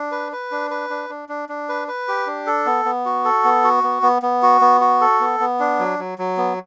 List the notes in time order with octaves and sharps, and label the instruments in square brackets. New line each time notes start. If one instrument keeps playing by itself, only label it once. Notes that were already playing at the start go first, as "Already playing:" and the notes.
Already playing: [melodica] D4
B4
B4
D4
B4
D4
D4
D4
D4
B4
B4
G4
D4
A4
B3
B3
F#4
A4
B3
F#4
B3
B3
B3
F#4
B3
F#4
A4
B3
B3
D4
F#3
F#3
F#3
B3